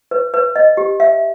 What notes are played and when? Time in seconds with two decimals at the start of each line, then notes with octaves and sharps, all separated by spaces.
0.11 B4
0.34 B4
0.56 D#5
0.77 G4
1.00 E5